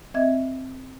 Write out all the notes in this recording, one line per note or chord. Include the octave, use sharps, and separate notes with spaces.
C4 D#5 E5 G#6